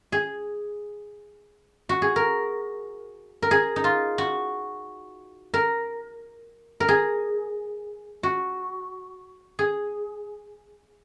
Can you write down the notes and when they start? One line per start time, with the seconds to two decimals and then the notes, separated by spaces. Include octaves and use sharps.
0.12 G#4
1.89 F#4
2.02 G#4
2.16 A#4
3.42 A#4
3.51 G#4
3.76 D#4
3.84 F4
4.18 F#4
5.54 A#4
6.80 A#4
6.88 G#4
8.23 F#4
9.59 G#4